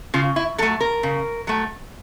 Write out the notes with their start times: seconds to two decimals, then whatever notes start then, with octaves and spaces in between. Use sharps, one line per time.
0.14 C#3 F4
0.36 E4
0.58 F#3 A4
0.62 A3
0.81 A#4
1.03 C#3
1.47 F#3 A3